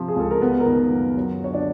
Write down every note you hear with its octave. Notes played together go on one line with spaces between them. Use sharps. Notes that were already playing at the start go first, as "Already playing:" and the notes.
Already playing: C3 F3
G#4
C#2 A4
A#4
G3 B3 B4
A#4
D#3 B3 B4
F#2
F#3
D3 C#5
D4 D5